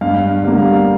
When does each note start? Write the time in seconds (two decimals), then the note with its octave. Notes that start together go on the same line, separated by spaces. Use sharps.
0.01 G2 F5
0.43 D3 G3 A#3
0.58 F5